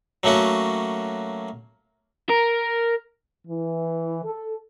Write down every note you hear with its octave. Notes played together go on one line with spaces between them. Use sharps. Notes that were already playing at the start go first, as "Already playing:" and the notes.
F#3 A3 A#3 C#4 F#4
A#4
E3
A4